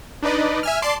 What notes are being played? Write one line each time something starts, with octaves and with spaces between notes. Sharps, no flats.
D4 D#4 B4 D5 D#5
E5 G#5 F6
D5 A5 C6 D6 C7